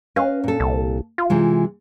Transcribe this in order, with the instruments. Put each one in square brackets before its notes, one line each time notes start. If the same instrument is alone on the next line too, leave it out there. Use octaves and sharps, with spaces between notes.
[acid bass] C#4 [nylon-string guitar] B4 D#5 F5
[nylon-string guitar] A#2 A4
[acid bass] C2
F4
[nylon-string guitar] C3 E3 G#3